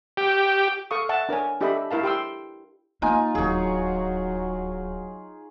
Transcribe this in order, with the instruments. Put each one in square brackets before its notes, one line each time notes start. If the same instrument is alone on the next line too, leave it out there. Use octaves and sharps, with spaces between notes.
[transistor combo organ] G4
[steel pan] A4 F5 C#6 D#6
E5 F#5 A5
D4 A#4 C#5 G#5
D4 G4 A4 D#5 E5 B5
E4 A#4 F5 A5
G4 G5 C6 E6
[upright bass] A#3 [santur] D#4 F4 G#5
[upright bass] D1 D#2 [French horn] F#3 [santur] G#4 C#5